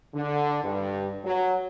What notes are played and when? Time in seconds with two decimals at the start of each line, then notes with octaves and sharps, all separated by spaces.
0.14 D3
0.63 G2
1.24 F#3